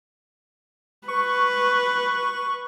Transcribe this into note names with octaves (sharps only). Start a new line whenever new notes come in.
B4 C#6